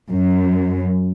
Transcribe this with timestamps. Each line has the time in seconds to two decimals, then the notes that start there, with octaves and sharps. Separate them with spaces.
0.11 F#2